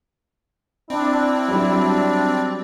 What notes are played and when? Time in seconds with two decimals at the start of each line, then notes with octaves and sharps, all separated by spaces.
0.90 C4 D4 E4
1.48 F#3 G3 D4